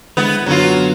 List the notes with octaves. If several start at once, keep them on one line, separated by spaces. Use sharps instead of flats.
D3 G#3 B3 E4
F#2 D3 F#3 B3 F4